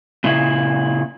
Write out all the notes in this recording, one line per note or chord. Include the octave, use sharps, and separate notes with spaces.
A#2 C#3 E4